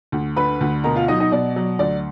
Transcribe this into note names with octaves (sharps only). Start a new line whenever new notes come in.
D2
D3 B4 B5
D2
B2 A#4 A#5
F4 F5
F#3 D#4 D#5
D#4 D#5
B2 D5
F#3
D2 D5